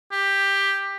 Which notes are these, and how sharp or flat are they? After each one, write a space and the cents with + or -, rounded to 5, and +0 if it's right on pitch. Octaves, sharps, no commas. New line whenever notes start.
G4 +10